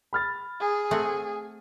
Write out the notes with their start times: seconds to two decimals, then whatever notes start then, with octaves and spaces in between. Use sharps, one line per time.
0.13 B5 F6 A6
0.60 G#4
0.91 A3 C4 F#5